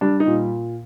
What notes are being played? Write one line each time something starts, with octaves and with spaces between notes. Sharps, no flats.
G3 D4
D#4
A#2